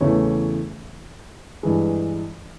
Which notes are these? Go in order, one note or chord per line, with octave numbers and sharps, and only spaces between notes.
E2 C#3 E3 A3 C#5
G2 E3 G#3